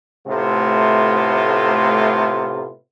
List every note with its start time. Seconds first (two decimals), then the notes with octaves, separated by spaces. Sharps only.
0.27 A2 C3 A3 B3 F4